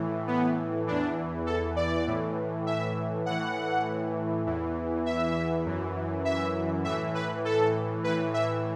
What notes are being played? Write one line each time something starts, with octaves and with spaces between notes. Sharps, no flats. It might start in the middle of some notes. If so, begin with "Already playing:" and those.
Already playing: A2 E3
B3
E2 E3 D4
A4
D5
A2 E3
E5
A2 E3 F#5
E2 E3
E5
F#2 E3
E5
A2 E3 E5
B4
A4
A2 E3 B4
E5